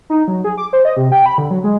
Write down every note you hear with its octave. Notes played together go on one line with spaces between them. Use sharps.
D#4
F#3
G#4
D6
C5
D#5
C3
G5
B5
D3
F#3
G#3